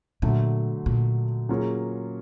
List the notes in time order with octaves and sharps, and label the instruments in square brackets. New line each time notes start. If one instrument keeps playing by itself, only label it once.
[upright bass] A#2 [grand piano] D3 F#3 A3
[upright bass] A#2
[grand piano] F#3 A#3 C#4 F4 G#4